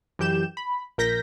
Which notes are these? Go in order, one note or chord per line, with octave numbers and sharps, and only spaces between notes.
F#2 E3 G4 G6 E7
B5
A#1 A#4 G6 A#6 B6